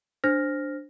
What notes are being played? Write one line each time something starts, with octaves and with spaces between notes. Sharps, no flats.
D4 C5 F6 A#6